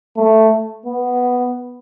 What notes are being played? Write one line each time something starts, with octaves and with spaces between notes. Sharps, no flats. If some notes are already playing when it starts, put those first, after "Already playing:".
A3
B3